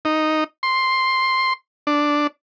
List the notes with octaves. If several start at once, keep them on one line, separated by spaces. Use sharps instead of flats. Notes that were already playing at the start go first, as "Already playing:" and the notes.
D#4
C6
D4